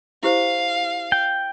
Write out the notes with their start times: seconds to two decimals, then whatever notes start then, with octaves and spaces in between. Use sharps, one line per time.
0.23 E4 G4 C5 F5
1.12 G5